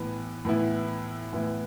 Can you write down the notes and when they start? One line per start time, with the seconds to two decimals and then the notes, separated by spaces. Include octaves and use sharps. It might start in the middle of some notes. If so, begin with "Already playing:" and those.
Already playing: A2 E3 B3
0.45 A2 E3 B3 E4
1.33 A2 E3 B3 E4